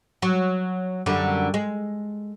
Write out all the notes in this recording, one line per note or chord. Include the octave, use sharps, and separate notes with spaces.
F#3
F#2 D3 G3
G#3